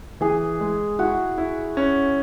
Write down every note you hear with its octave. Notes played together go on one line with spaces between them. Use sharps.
E3 G#4
G#3
E4 F#4
E4
C#4